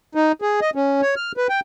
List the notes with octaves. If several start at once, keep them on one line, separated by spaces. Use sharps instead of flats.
D#4
G#4
D#5
C#4
C#5
F6
B4
G5